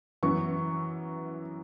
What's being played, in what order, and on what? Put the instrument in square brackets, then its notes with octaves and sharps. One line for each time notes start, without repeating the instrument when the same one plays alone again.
[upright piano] F#2 E3 B3 C#6